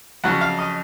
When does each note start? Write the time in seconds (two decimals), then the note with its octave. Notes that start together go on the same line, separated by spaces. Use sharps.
0.24 F2 C#3 F#3 C#4 F#5
0.41 F5
0.59 D#5